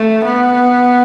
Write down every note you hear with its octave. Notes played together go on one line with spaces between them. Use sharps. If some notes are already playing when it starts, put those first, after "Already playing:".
Already playing: A3
B3